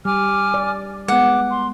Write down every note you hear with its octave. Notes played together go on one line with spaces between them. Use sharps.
G3 G#5 D6 F6
D5
G#3 B3 F#5 D6
C6